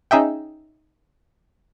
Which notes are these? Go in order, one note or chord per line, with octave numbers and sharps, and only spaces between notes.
C#4 D#4 G#4 E5 G5